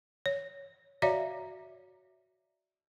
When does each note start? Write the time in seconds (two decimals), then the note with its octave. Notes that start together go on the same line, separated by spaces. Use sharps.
0.26 C#5
1.02 F#4 C#5 D5 E5 F5 A#5